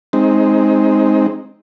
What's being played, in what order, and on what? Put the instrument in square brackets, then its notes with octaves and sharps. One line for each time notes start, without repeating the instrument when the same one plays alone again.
[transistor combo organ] G#3 C4 D#4